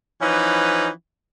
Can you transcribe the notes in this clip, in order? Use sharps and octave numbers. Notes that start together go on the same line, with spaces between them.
E3 F3 C#4 D#4 B4